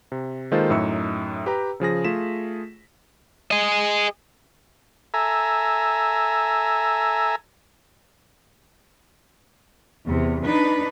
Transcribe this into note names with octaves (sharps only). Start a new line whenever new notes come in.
C3
D#3 G#3 A#3 F4 A4 C5
F#2 A2 D#4 E5 E6 C#7
G4 B4 G5 A#5
C#3 F3 G#4 A#6
A3 F4 G#4 B6 E7
G#4 D#5
A4 E5 G#5 A#5
E2 C3
D4 D#4 B4